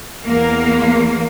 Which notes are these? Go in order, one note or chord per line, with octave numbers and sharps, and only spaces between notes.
E2 A#3